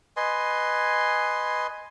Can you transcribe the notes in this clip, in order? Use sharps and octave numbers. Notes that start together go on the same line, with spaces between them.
B4 D#5 G#5 C6